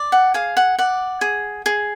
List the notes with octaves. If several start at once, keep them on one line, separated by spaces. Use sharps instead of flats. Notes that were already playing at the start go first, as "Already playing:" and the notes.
Already playing: D5
F#5
G#4 F5
F#5
D5 F#5
G#4
G#4